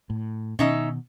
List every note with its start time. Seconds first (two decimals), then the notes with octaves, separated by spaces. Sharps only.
0.10 A2
0.59 B2 D#3 C#4 D#4 E5